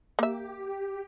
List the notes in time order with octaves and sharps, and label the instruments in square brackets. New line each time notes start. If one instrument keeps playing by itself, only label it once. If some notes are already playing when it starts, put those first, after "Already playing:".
[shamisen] A#3 E5 [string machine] G4